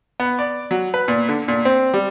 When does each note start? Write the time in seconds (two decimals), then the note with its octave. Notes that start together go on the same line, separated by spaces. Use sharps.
0.20 B3
0.39 D5
0.71 F#3
0.94 B4
1.08 A#2
1.28 D3
1.48 A#2
1.65 C4
1.94 G3